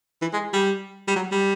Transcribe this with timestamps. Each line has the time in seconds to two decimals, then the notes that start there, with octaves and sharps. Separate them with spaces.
0.22 E3
0.33 G#3
0.53 G3
1.08 G3
1.16 F#3
1.32 G3